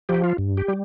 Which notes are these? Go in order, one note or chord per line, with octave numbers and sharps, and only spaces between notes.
F3 G4
F4
G2
G4
G3